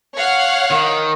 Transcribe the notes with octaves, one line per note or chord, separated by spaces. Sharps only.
C#5 F5 F#5
D#3